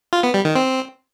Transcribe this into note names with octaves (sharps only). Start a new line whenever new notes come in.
F4
B3
G3
D#3
C4